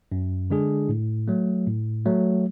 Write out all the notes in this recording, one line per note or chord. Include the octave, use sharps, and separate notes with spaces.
F#2
D3 G#3 D4 G#4
A2
F#3 A3
A2
F#3 A3